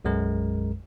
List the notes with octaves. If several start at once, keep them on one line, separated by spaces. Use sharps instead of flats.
B1 F#2 G#3 A#4